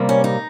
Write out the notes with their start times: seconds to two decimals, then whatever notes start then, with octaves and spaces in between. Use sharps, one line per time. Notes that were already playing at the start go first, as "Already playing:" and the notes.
Already playing: C3 G3 A#3
0.09 C#4
0.24 D#4